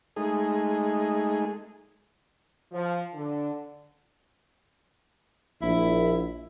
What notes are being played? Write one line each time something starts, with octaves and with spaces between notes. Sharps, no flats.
G#3 A3 D#4 G#4
F3
D3
A#1 E4